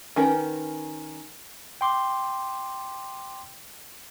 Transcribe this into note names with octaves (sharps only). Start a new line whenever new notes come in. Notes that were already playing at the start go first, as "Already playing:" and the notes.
D#3 C#4 A#4 B4
G5 C6 D6